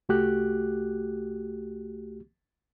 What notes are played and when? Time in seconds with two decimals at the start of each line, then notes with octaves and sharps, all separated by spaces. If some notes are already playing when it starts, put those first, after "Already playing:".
0.09 C2 A3 F#4 G4 F#6